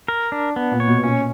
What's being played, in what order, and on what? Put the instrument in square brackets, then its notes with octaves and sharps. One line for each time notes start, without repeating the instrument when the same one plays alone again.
[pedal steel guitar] A#4
D4
B3
[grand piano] A#2
[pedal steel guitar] C#5
[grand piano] B2
[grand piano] A#2 [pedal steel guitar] C#4